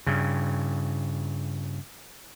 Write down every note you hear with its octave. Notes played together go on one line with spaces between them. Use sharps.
G2 C#3